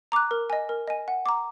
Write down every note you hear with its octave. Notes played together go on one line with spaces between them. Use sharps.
A#5 D6 F#6
A#4
D#5 G#5
A#4
D#5 G#5
F#5
A#5 D6